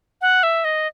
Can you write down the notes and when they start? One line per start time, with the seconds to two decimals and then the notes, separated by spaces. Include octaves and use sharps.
0.21 F#5
0.43 E5
0.64 D#5